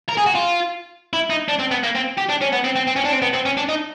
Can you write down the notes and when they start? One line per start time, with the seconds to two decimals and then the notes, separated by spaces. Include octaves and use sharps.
0.09 A#4
0.17 G#4
0.26 F#4
0.35 F4
1.13 E4
1.30 D#4
1.48 D4
1.59 C4
1.71 B3
1.83 A#3
1.95 C4
2.17 G4
2.29 D4
2.41 C#4
2.52 B3
2.64 C4
2.76 C4
2.87 C4
2.96 C#4
3.05 D4
3.13 C4
3.22 B3
3.34 C4
3.46 C#4
3.57 D4
3.69 D#4